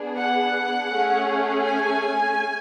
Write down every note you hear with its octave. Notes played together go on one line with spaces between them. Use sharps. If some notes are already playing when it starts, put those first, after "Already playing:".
Already playing: B3 D4 G#4
F#5
A3 C#4 G#4
G#5